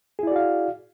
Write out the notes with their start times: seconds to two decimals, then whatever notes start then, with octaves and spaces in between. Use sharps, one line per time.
0.19 G#4
0.23 E4
0.27 D5
0.32 F#4
0.36 F5